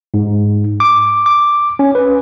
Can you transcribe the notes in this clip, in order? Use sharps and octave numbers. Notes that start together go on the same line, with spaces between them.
G#2
D6
D6
C#4
B4